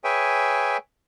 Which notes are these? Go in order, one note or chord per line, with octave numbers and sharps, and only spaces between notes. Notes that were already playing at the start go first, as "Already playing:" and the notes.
G#4 B4 C#5 E5 G5 G#5